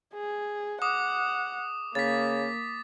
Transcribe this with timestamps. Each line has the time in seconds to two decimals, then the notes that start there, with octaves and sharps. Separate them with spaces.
0.14 G#4
0.82 F#5 D6 D#6
1.95 C#3 A#3 A6 B6